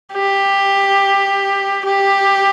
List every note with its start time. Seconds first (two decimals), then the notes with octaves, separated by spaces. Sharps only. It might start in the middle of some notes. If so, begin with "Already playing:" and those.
0.13 G4
1.86 G4